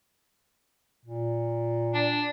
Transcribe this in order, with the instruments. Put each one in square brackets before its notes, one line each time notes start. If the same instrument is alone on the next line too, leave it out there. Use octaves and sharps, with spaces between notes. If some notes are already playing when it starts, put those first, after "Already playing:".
[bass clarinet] A#2
[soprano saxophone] D4